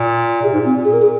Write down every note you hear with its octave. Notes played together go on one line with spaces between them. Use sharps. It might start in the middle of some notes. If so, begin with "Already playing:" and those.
Already playing: A#2
C3 G#4
G#2 D#4
A#2
C4
A#2
G#4
A#4
G#4